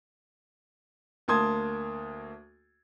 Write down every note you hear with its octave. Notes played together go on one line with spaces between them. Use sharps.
D2 A#3 A5 C6 D#6 G#6